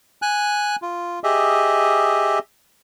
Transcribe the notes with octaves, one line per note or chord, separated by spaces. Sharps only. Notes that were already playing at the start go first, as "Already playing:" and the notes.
G#5 F#6
F4
G4 G#4 D#5 E5